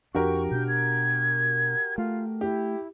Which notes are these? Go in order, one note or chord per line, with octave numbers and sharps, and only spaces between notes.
F2 F3 D4 F#4 G4 A#4 C#6
B2 D4 G6
G#6
A3 F4
E4 G4